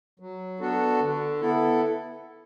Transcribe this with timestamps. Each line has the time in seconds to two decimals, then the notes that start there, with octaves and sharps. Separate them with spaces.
0.20 F#3
0.59 B3 D4 F#4 A4
1.01 D3
1.41 B3 E4 A4